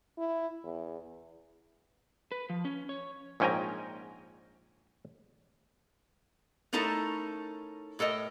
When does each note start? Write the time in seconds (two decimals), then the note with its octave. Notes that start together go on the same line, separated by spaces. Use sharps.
0.18 E4
0.64 E2
2.32 B4
2.50 F3
2.65 C#4
2.89 C#5
3.40 A#1 G#2 C#4 G5 G#5 A#5
6.73 A3 C#4 D#4 E4 A4 A#4
7.99 A2 A4 A#4 D#5